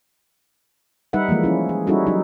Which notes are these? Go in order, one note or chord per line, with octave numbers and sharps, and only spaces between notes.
G3 D#4 B4 E5 F#5
E3 F3 G#3 A#3
F3 C#4 E4
G#4
G3 C#4 D#4 E4 F#4 A4
F#3 D#4